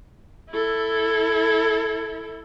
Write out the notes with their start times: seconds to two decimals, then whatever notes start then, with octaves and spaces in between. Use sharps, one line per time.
0.50 E4 A4